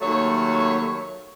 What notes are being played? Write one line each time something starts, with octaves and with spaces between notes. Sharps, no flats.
D#2 F#3 A3 C#5